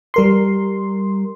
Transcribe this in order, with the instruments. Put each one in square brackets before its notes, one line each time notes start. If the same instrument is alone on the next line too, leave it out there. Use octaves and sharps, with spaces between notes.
[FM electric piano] G3 A#4 C6